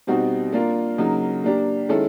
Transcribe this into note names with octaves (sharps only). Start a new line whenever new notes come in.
B2 G3 C4 D#4 F#4
A#3 D4 F4 A#4
C#3 F#3 A#3 D#4
A#3 D4 G4
D#3 G#3 C#4 E4 A4